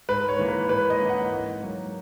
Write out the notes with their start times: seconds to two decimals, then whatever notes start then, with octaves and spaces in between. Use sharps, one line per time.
0.09 G#2 B4
0.28 C#5
0.39 E3 A#3
0.48 B4
0.69 G#2 B4
0.90 D#5
0.99 E3 A#3
1.09 F#5
1.30 G#2
1.61 F#3 A#3